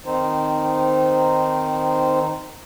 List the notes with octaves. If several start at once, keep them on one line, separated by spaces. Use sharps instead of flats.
D#3 C4 D#4 C5